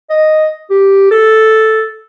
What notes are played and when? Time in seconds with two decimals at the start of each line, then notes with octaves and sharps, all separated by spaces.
0.10 D#5
0.70 G4
1.11 A4